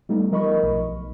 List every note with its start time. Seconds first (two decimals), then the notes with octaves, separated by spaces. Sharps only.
0.09 G3 A3 B3 D#4
0.31 F3 A#4 D#5 B5 C#6
0.63 B1